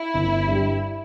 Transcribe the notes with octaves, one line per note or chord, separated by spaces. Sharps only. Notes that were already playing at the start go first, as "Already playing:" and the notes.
Already playing: E4
G1
G2 G3